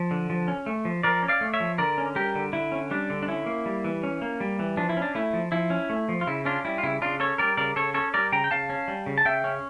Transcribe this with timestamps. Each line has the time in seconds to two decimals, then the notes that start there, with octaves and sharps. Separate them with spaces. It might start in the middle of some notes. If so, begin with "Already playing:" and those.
Already playing: F3
0.11 D3
0.30 F3
0.48 C#4
0.66 A3
0.85 F3
1.03 F3 A#4 D5
1.23 C#4
1.28 D5 F5
1.41 A3
1.54 C#5 E5
1.60 F3
1.78 D3 A#4 D5
1.98 C#4
2.15 G3 G4 A#4
2.35 D3
2.53 D3 E4
2.72 C#4
2.91 G3 D4
3.10 D3
3.23 D4
3.28 C#4 E4
3.46 A#3
3.66 G3
3.84 E3
4.03 C#4
4.22 A#3
4.40 G3
4.59 E3
4.77 F3 D4
4.89 E4
4.97 C#4
5.02 D4
5.15 A3 E4
5.33 F3
5.52 F3 E4
5.70 C#4
5.90 A3
6.09 F3
6.21 F4
6.27 C#3 E4
6.45 C#4 D4 F4
6.65 G3 E4
6.78 F4
6.83 C#3 E4
7.01 C#3 D4 F4
7.20 C#4 A4 C#5
7.38 G3 A#4 D5
7.57 C#3 A#4 D5
7.76 C#3 A4 C#5
7.94 C#4 A4 C#5
8.14 G3 A#4 D5
8.32 C#3 G5 A#5
8.44 G5
8.51 C#3 F5 A5
8.70 C#4
8.88 G3
9.06 C#3
9.18 A5
9.25 C#3 E5 G5
9.44 C#4